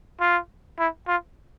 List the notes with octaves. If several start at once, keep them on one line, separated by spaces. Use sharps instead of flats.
F4
E4
F4